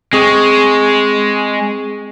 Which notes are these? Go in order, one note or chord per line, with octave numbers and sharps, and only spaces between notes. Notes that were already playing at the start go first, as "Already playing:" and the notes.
G#3 C4 G#4 C#6